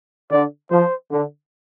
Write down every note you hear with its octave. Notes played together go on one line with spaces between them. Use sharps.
D3 D5
F3 C5
D3